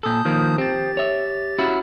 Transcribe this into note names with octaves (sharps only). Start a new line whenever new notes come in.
A#2 A4 A5 D#6 G6
D#3 F3 A#3
C4 G4 A6
C#5 E5
C#4 E4 F#4